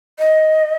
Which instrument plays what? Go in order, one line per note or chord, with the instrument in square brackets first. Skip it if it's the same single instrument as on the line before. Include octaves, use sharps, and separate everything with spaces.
[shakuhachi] D#5